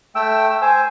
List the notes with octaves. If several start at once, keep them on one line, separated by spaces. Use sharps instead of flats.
A3 G5 E6
C5 G#5